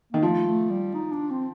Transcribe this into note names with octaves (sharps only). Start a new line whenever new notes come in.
D#3 A#3
F3 A3
A3
G3
D#4
D4
C4